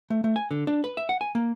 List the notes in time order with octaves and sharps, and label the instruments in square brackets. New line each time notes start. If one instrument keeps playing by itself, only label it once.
[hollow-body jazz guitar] A3
A3
G#5
D3
D4
B4
E5
F#5
G#5
A#3